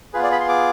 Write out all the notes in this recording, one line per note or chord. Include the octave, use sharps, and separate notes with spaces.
B3 F4 G#4 B4
D5
B5
C6
D6